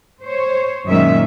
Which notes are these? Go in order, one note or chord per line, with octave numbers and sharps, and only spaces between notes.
C5 C#5
F#2 A#2 D#3 G#3 C#4 E5